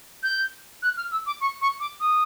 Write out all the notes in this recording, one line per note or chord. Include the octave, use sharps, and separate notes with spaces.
G6
F#6
F6
E6
D6
C#6
C#6
D6
D#6